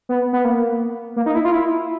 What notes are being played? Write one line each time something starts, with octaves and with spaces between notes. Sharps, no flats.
B3
B3
A#3
A#3
D#4
E4
F4
E4